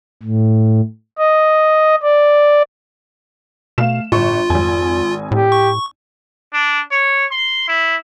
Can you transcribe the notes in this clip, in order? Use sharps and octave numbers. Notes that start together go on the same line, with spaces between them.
A2
D#5
D5
B2 A3 F5 E7
G1 A2 F4 C#6
G#1 F2 G#5
A2 G4
C#6
D4
C#5
C6
E4